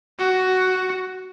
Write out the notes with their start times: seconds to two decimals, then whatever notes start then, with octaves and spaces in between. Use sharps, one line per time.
0.19 F#4